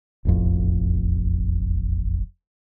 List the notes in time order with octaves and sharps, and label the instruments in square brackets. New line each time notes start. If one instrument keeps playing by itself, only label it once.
[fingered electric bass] E1 A1 F2